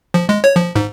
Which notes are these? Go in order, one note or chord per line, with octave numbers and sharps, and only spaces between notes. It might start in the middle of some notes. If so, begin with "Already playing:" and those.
F3
G#3
C#5
F3
G#2